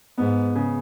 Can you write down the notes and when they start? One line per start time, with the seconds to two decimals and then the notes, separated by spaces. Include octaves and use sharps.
0.18 G#2 B3
0.55 C#3